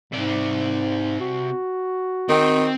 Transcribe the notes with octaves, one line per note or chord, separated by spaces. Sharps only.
G#2 C3 D5
F#4
D#3 C4 G5